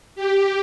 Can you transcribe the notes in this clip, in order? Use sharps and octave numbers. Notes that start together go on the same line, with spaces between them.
G4